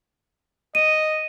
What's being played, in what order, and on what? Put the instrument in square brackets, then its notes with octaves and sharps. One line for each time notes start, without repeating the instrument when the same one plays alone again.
[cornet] D#5 [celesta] D#7